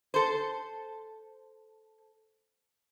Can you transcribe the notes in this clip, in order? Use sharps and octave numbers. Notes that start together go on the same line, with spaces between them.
A4 C5